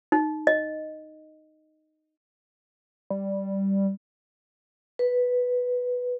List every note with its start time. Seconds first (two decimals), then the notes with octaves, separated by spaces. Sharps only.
0.12 D#4
0.47 D#5
3.10 G3
4.99 B4